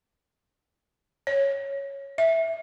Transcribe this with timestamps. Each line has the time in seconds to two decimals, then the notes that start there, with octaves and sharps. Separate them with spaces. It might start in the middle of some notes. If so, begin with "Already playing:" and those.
1.27 C#5
2.18 E5